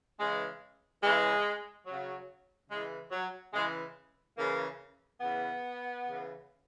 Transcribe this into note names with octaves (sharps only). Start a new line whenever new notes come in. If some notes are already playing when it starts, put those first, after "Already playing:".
C#3 E3 G#3
C#3 E3 G#3
C#3 F#3
C#3 E3 G#3
F#3
C#3 E3 G#3
C#3 E3 A#3
C#3 E3 B3
C#3 E3